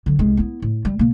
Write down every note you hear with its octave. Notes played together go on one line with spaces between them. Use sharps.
D3 F#3
C2 G#3
B3 E4
A2
G3
B2 A#3